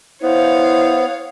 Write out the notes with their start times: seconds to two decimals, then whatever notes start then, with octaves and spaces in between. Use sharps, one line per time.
0.23 B3 E4 C5 C#5 F5